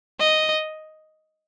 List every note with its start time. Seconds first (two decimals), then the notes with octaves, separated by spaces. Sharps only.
0.19 D#5